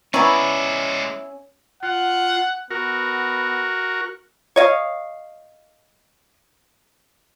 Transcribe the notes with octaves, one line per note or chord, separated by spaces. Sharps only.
G#3 B3 C#4 E4 C#5 D5 A#5 C#6
F4 F#5
B3 F#4 A#4
C#5 D#5 F5